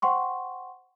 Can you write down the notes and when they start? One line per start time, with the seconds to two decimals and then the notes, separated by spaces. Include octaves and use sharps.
0.02 C5 F#5 G5 C6 C#6